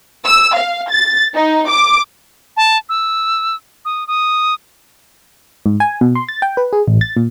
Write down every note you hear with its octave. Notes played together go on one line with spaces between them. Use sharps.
E6
F5
A6
D#4
D6
A5
E6
D#6
D#6
G#2
G#5
B2
C6
A6
G5
B4
G#4
A1
A6
A#2